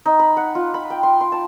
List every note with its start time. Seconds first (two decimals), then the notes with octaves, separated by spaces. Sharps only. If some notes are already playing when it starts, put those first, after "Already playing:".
0.06 D#4
0.19 B5
0.37 F#5
0.55 F4
0.74 B5
0.90 G5
1.03 C6
1.21 C6
1.32 A5